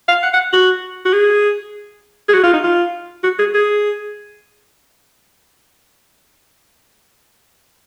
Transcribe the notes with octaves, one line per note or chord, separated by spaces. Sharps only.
F5
F#5
F#5
F#4
F#4
G#4
G#4
F#4
F4
D#4
F4
F#4
G#4
G#4